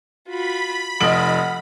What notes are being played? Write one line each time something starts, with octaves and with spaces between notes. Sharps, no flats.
F4 F#4 B5
F1 D#5 F#5 F6 D7 F#7